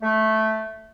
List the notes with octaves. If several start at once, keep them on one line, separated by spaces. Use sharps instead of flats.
A3